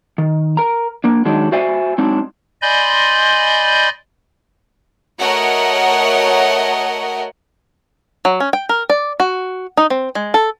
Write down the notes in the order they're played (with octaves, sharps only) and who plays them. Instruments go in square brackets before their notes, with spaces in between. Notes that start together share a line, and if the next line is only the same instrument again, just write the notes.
[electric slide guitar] D#3
A#4 A#5
A#3 D4
D#3 F#3 G#3 D4 D#4
F#4 C5 D5 E5 F5 G#5
F#3 G#3 C4 D4 D#4
[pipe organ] D5 D#5 G#5 B5 C6 G6
[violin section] A3 F#4 A#4 C#5 D#5 F#5
[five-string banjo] F#3
C#4
G5
A#4
D5
F#4
D#4
C4
G#3
A4